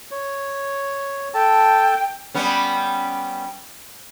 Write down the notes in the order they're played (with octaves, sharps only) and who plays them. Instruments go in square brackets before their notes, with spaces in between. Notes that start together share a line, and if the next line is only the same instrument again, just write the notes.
[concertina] C#5
[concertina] A4 A5 [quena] G5
[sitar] G3 B3 C#4